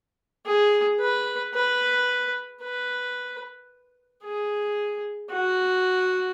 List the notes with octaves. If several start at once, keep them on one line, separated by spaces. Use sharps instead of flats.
G#4
B4
B4
B4
G#4
F#4